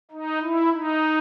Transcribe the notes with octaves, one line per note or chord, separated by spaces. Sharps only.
D#4
E4
D#4